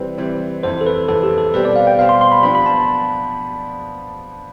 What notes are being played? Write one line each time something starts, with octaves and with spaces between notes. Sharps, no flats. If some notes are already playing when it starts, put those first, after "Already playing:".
Already playing: C3 E3 G3 C4 B4
C3 E3 G3 C4
F2 C3 E3 C5
A4
B4
F2 C3 E3 A4
G4
A4
B2 G3 C4 G4 B4 C5
D5
F5
G5
B2 G3 C4 G4 C5 F5
C6
C6
B5
F3 B3 D4 B5
B5
A5